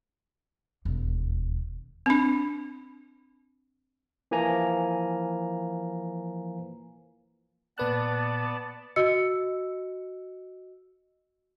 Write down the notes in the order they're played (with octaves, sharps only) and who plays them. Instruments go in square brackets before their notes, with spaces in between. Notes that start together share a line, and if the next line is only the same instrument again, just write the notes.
[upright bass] E1 D#2
[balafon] C4 D4
[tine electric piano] E3 F3 A#3 G#5 A#5
[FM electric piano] A#2 B4 F#6 [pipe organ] B3 D5 A5
[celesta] F#4 D#5 E6 C#7